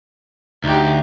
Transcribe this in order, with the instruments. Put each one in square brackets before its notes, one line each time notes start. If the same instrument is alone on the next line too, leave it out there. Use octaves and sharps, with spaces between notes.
[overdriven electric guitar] D2 [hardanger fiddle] D#4 G4